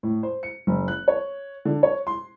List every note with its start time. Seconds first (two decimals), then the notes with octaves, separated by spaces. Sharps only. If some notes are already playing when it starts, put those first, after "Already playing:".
0.03 A2
0.23 C5
0.43 C#7
0.67 F#1
0.88 F#6
1.08 C#5
1.65 D3
1.83 C#5
2.07 C6